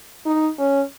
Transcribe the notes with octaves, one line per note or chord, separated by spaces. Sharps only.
D#4
C#4